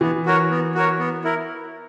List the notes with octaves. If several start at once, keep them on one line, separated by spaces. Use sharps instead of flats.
E3 B3
F#4 A#4 C#5
B3
F#4 A#4 C#5
B3
E4 A#4